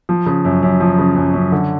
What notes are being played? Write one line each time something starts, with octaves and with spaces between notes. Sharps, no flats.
F3
C#3
F#2
F#2
F3
C#3
F#2
F#2
D3